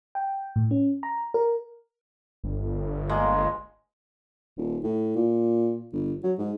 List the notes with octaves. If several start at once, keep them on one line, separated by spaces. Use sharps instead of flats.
G5
A2
C#4
A#5
A#4
G1
G#3 A#3
D#1
A2
A#2
G1
F#3
G#2